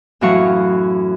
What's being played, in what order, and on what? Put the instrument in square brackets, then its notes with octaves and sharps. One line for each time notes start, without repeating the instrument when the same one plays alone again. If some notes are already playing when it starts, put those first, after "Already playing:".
[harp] F#2 A2 E3 F#3 F5 C#6